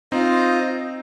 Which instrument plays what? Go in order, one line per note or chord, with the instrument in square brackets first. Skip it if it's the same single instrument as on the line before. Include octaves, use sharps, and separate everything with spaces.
[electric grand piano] C4 D#4 [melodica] F4 C5 D#5